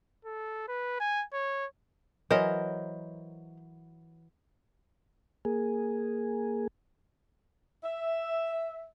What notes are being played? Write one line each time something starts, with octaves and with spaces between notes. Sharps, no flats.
A4
B4
G#5
C#5
E3 F#3 A#4 C5 D#5
A#3 G#4
E5